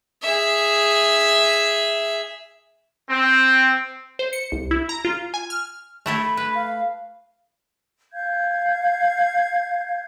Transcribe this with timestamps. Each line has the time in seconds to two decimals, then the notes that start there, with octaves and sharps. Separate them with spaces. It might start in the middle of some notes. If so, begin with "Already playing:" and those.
0.22 G#4 E5
3.09 C4
4.19 C5
4.33 C#7
4.52 C2
4.71 E4
4.89 A#5
5.05 F4
5.34 G#5
5.50 F6
6.06 A3 E4 A4
6.24 B5
6.37 B4
6.55 F5
8.12 F5 G6 G#6